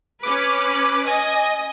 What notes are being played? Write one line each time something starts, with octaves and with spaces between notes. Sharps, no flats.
C#4 B4 D6
D#5 G#5